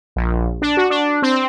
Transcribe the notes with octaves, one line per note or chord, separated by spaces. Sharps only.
A#1
D4
F#4
D4
C4